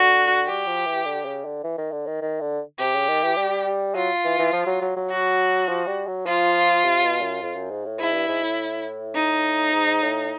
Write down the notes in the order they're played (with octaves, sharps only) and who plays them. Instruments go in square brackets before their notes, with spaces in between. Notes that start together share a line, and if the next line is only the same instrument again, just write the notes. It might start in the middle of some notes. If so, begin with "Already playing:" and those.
Already playing: [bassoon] D3 [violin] F#4
[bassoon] G3 [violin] G4
[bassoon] F3
E3
D3
C#3
D3
E3
D#3
D3
D#3
D#3
D3
[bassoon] C3 [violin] G4
[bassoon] C#3
D#3
E3
G3
[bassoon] F#3 [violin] F4
[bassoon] E3
E3
F3
F#3
F#3
F#3
[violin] F#4
[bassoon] F3
G3
F#3
[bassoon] F3 [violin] F4
[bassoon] C3
B2
F#2
F2
F#2
G#2
A2
[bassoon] G#2 [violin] E4
[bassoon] G2
G#2
A2
[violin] D#4
[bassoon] G#2
A2